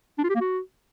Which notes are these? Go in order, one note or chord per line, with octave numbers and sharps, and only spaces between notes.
D4
F4
G4
A#3
F#4